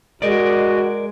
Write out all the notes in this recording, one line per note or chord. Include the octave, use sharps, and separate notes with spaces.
G#3 F#4 A#4 D5 D#5